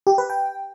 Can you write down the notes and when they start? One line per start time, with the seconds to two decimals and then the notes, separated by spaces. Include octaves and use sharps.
0.07 G4
0.18 B4
0.30 G5